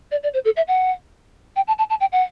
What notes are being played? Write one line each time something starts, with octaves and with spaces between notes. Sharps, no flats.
D5
D5
C5
A4
E5
F#5
G5
A5
A5
A5
G5
F#5